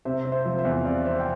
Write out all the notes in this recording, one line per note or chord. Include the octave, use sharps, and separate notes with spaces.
C3 C5 E5
C4
C5 E5
F3
C5 E5
E2
C3 D5 F5
C4 C5 E5
G5